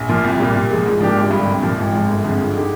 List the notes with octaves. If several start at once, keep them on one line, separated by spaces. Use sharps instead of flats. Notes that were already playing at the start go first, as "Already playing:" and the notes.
Already playing: A#1
A#2 F3 A#3 F4
C2
A#2 G3
A#2
F3 G#3
G#2
F3 A#3 D4 G4
G#1
G2
D3
C2
A#2 F3
G#1
G#2 F3
G1
F2 D3 F3 G#3
G2
D3 G#3 D#4 G4